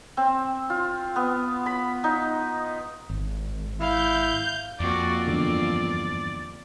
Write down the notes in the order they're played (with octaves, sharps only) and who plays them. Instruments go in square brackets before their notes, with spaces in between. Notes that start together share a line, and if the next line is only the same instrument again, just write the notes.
[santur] C4
F4
B3
B5
D#4
[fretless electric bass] G#1
[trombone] E4 [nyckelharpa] F5 [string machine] G6
[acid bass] F2 [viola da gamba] F3 A#3 C4 [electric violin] F#4 D5
[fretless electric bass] E2 G2 D3 [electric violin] D5